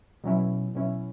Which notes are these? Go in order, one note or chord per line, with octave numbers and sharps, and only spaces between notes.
B2 F#3 C#4 E4
B2 F#3 C#4 E4